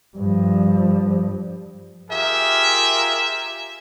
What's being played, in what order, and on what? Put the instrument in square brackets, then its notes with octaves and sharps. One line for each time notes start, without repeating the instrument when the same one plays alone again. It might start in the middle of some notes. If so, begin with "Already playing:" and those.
[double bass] G2 F3
[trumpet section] F4 G4 G#4 A#4 E5